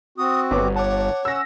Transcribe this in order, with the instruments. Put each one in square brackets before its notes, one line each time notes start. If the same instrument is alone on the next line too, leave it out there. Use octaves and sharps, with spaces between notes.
[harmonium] C4 F#4 [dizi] D#6
[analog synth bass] G1 [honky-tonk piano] B3 C#5 [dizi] D6
[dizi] C#5 [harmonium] F#5 [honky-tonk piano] A5 D6
[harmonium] C#4 F#5 [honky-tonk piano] E6 A#6